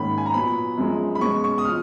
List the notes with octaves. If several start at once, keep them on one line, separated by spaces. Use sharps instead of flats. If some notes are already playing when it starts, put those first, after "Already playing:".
Already playing: G#2 D#3 A#3 C#4 B5
G#5
A#5
A#2 F#3 B3 B5
F#2 F3 G#3
B5
B2 G#3 C#4 C#6
C#6
D#6
F3 F6